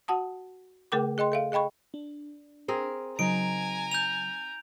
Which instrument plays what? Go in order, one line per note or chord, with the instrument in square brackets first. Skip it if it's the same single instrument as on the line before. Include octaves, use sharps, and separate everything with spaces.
[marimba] F#4 F#5 A5 D#6
C#3 A3 G#4 A#4 G5 D6
G#4 D#5 G5 C6
A4 E5 F5
G#4 D#5 G5 B5 C#6
[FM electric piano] D4
[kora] C4 G#4 A#4
[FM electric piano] C#3 F#3 [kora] D#4 [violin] G#5 A#5 [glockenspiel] D7
[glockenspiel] G6 F7